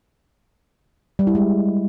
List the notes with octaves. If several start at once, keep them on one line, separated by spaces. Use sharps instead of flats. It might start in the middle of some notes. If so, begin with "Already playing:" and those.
G3
E4
G#3